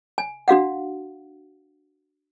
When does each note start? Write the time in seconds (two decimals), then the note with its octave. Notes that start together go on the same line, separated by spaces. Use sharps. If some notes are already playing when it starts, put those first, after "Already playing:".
0.18 G#5
0.48 D4 F#4 F5 F#5